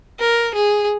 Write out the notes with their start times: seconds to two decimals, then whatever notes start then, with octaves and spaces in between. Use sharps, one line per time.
0.19 A#4
0.55 G#4